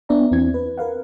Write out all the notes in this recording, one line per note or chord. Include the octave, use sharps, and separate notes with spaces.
B3 D4 D5 E5 A#5
E2 C4 E4 G#6
B4
A#4 B4 F5 F#5